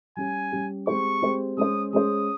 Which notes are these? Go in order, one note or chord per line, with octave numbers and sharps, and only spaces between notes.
G3 C#4 G4 G#5
G3 C#4 G4
G#3 C4 G4 C5 C#6
G#3 C4 G4 C5
G#3 C#4 G#4 C5 D#6
G#3 C#4 G#4 C5 D#6